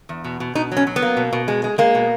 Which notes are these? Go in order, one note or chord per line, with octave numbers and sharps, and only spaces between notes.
E2
B2
B2
B2 D#4
F#3
C#4
F#3
B3
A#3
B2
B2
G#3
G#3
G#3 A#3
B2